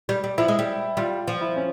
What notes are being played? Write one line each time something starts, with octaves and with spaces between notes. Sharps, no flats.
G3
G3
F3 E4
G#3
G3
G3 F4
F3 F4
E4
C#4